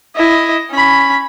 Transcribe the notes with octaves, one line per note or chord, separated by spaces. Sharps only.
E4 D#5
C#4 B5